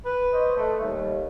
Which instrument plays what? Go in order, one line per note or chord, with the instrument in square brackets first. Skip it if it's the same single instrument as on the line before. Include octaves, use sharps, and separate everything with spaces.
[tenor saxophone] B4
[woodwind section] C5 C#5 D#5
A3
[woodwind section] D#2 [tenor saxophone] G3